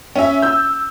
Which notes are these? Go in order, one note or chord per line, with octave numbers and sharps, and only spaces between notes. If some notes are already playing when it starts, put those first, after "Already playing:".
C#4 E5
E6 G6